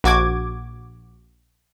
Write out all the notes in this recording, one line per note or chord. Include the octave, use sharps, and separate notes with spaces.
A#1 F#4 D6 G#6